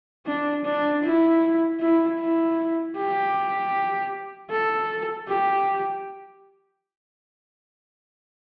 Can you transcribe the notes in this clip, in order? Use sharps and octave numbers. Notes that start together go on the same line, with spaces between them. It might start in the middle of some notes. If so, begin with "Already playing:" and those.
D4
D4
E4
E4
E4
G4
A4
G4